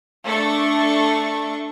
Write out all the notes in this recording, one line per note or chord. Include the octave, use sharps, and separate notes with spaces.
A3 D4 A4 C#6